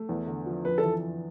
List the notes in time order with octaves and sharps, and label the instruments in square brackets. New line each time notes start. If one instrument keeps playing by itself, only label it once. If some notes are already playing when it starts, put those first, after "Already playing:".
Already playing: [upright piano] A3
E2
D3
F3
[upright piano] F2 [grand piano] B4
[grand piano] A4
[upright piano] E3